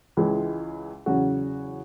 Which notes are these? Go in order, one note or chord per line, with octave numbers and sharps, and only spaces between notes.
C#2 C#3 E3 G#3
E2 C#3 F#3 C#4 F#4